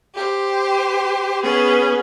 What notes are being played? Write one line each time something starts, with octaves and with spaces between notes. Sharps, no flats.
G4 C5
B3 C#4 G#4 B4